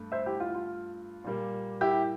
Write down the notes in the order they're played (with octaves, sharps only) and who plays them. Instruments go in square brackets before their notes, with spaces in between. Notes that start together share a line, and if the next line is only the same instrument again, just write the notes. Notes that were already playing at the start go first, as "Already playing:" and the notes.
Already playing: [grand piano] G2 A3
[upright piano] C5 E5
E4 G4
F4
F4
[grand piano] A#2 G3 A#3
[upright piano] E4 G4